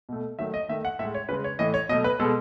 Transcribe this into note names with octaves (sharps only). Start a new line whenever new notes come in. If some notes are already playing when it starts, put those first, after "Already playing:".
B2 A3
D#3 F#3 A3 E5
D#5
D#3 A3 E5
F#5
A2 G#3 E5
C#5
C#3 G#3 B4
C#5
A2 E3 A3 D#5
C#5
B2 F#3 A3 D#5
B4
B2 G#3 A4